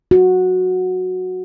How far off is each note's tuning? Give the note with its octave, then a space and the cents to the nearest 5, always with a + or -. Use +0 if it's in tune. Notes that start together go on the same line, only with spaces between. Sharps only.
F#4 -10